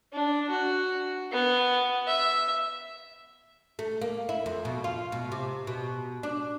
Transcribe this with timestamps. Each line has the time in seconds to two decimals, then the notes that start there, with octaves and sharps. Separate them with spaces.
0.13 D4
0.50 F#4
1.32 B3
2.07 E5
3.79 A3
4.01 A#3
4.29 E4
4.46 F2
4.65 B2
4.84 F4
5.12 B2
5.32 C3
5.67 B2
6.23 D4